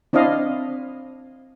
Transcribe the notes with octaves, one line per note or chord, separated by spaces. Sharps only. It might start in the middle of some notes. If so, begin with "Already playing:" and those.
C4 D4 E4 D#5 F5